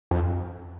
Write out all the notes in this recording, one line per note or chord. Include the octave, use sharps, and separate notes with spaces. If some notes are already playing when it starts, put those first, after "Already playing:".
F2